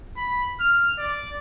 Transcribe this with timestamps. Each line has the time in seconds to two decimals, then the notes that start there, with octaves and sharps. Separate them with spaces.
0.17 B5
0.60 F6
0.98 D5